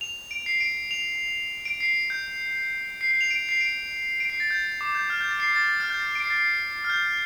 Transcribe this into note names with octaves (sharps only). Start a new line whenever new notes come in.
F7
D7
C7
D7
F7
D7
C7
G6
C7
C7
F7
D7
C7
D7
D7
C7
A6
G6
D6
G6
F6
G6
A6
C7
A6
F6
G6
A6
D7
C7
A6
C7
F6
G6